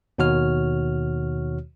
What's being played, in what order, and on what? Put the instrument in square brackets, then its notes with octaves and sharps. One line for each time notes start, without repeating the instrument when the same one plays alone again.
[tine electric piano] D#2 B2 D#3 F#4 C#5 F6